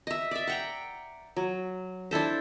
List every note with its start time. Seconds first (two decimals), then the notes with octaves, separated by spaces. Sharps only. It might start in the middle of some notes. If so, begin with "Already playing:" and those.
0.07 D#5 E5
0.31 D5 E5
0.47 F#5 G5 A#5
1.36 F#3
2.11 D4 E4 A4 C5